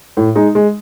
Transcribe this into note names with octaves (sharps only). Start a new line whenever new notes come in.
A2
G#3 D#4
G#3